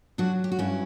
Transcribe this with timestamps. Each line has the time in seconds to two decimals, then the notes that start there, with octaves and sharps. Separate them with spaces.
0.18 F#3 D4 F#4
0.44 G4
0.52 F#4
0.59 G2 C#4 E4